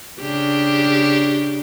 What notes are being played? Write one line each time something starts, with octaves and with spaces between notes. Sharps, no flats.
C#3 D4 G4